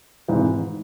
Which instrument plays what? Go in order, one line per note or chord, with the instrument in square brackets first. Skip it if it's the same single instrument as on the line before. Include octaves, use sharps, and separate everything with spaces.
[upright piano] G#1 G#2 E3